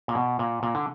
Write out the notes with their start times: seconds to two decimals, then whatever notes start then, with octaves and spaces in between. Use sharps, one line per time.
0.08 A#2
0.15 B2
0.39 A#2
0.63 A#2
0.75 D3